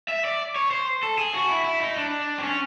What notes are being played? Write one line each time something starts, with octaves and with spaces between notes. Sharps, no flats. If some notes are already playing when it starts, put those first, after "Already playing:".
E5
D5
C#5
C5
A4
G#4
F#4
E4
E4
D#4
D4
C4
C#4